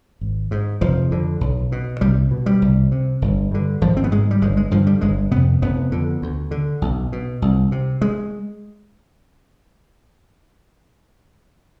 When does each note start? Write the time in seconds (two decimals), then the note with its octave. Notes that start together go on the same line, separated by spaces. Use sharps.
0.21 G#1
0.51 G#2
0.81 F1 F3
1.11 F2 D3
1.41 B1
1.72 B2
2.01 C2 G3
2.31 B2
2.46 G3
2.62 C2
2.92 C3
3.22 G1
3.51 G2 D3
3.81 G#1 F3
3.97 C4
4.04 B3
4.12 G#2 G#3
4.31 G3
4.41 G1 G#3
4.57 G#3
4.71 G2 D3 F3
4.87 G3
5.01 G1 G#3
5.31 C3 B3
5.36 F2
5.62 F1 B3
5.92 F2 D3
6.22 D2
6.51 D3
6.82 B1
7.12 B2
7.42 C2
7.72 C3
8.02 G#3